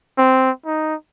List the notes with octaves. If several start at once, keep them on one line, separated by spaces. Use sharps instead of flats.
C4
D#4